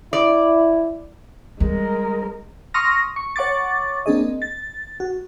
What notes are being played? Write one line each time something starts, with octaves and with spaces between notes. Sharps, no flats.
E4 D5
G3 G#3 A#4
C6 C#6 D#6 F6 A#6
C#6
C#5 F#5 C#6 D6 A6
A#3 C4 D4 G#4 D#5
A6
F#4